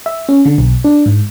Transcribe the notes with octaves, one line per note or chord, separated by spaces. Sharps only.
E5
C#4
D3
B1
D4
G#2